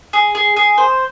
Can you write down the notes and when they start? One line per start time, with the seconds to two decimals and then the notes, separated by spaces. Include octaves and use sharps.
0.13 G#4
0.35 G#4
0.56 G#4
0.78 C5